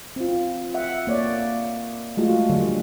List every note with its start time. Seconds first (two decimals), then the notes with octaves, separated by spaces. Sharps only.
0.16 C4 F4
0.74 E5 F#5
1.07 A#3 C#5 D5
2.17 G#3 A3 F4 F#4
2.49 D3 F#3 G3